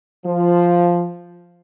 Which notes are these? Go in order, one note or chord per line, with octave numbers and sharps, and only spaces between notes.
F3